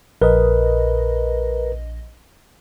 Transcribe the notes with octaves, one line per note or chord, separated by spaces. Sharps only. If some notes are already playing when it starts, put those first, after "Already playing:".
A#1 A#4 B4 D#5